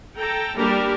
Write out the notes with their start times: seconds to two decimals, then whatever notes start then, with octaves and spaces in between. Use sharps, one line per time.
0.16 A4 G5 A#5
0.57 G3 A#3 D4 G4 A#4